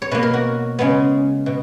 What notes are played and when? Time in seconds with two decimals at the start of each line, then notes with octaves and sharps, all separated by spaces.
0.02 C#5
0.11 B2 A#3 B4
0.23 A#4
0.34 F#4
0.79 C#3 G#3 B3
1.46 B2